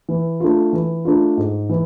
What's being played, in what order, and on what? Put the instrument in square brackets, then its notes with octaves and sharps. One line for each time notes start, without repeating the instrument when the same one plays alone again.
[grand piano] E3
A3 D4 F4
E3
A3 D4 F4
G#2
E3